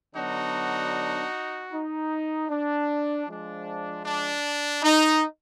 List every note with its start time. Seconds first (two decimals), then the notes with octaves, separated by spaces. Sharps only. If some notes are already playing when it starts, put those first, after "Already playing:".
0.16 D3 F#3 B3 D4 D#4 F#4
1.72 D#4
2.49 D4
3.28 F3 G#3 D4
4.05 D4
4.83 D#4